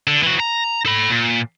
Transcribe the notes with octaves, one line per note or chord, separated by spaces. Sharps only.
D3
E3 F#4
A#5
A4 B5
A#2